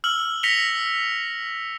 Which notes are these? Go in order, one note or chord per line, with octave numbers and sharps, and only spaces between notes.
E6 F6 F#7
A#6 B6 C#7 F7 G7